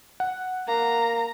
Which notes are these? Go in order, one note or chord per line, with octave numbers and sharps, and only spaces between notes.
F#5
A#3 A#5